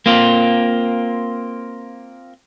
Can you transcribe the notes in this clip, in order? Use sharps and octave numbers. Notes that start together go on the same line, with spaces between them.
A#3 C4 F4